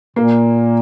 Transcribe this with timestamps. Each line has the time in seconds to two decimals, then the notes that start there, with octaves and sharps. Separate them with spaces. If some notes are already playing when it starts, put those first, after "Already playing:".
0.16 A#2 A#3